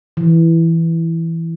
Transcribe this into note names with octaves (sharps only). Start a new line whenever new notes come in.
E3